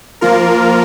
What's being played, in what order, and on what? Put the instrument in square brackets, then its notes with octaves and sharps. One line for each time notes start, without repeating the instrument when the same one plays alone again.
[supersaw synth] F3 A#3 F4 A#4